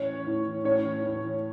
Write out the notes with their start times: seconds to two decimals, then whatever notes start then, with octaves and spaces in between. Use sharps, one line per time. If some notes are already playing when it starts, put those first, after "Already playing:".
Already playing: A2 E3 C#4 C#5
0.27 A2 E3
0.64 A2 E3 C#4 C#5
1.03 A2 E3